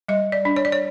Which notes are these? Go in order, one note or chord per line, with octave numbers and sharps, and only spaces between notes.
G3 D#5
D5
D4
C#5
D5
C#5